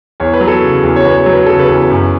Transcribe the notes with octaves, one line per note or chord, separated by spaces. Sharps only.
E2 C#5
B4
F#3
A4
C#3
E2
C#5
E2 B4
C#5
F#3
B4
C#3 A4
B4
E2
F#2